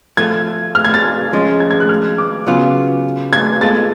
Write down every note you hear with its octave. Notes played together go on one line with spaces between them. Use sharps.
F3 A3 F4 A4 G#6
F6
G#6
A6
F3 G#3 C#4
G#6
G#6
F#6
F6
D6
C#3 F#3 B3 F4
G#6
G#3 B3 F4 A4 A6